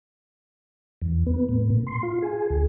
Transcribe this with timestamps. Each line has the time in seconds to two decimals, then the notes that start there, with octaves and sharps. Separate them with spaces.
1.02 E2
1.26 B3
1.49 A2
1.70 A#2
1.87 C6
2.03 F4
2.22 G#4
2.50 D2